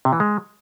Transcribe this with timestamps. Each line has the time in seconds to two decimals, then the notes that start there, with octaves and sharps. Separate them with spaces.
0.05 C3
0.13 E3
0.20 G#3